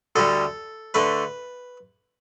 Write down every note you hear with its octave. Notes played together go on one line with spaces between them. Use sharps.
D2 D3 G3 A4
D3 A3 B4